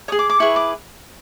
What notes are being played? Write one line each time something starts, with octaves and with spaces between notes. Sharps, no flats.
G#4 C#5 D#6
D6
D6
E4 G#4 B4 C#6
D6